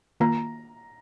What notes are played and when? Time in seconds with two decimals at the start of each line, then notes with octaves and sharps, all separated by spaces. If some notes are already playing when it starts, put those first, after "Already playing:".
0.20 D#3 A#3 F4 A#5